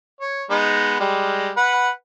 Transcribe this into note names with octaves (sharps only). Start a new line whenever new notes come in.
C#5
G#3 B3 D#4
G3 G#3
B4 F#5